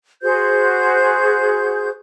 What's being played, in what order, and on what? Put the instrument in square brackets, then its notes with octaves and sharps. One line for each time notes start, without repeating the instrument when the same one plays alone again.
[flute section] F#4 G#4 C5 G6